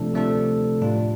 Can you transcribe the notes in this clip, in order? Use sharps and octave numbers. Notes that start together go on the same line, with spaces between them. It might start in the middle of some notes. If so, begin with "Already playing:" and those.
Already playing: C3 F3 A3 D4 A4
C3 F3 A3 D4 A4
A2 G3 D4 F4